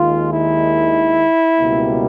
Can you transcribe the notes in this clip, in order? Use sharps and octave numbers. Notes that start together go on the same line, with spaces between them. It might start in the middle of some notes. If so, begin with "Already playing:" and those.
Already playing: D#2 D#3 G#3 F4
E4
C#2 B2 G3 A#3